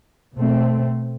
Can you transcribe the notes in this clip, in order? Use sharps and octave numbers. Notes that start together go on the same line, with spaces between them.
B2 A3 C4